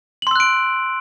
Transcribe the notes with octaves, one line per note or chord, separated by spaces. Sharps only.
C6 E6 F#6 D7 F#7